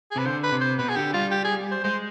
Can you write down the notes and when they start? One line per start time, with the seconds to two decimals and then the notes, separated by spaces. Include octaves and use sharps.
0.11 G#4
0.16 C3 B4
0.25 D3 C5
0.43 B4
0.52 C3
0.61 C5
0.78 B2 B4
0.89 G#4
0.96 D3 G4
1.13 G3 F4
1.31 G4
1.44 G#4
1.71 C5
1.84 G#3 C5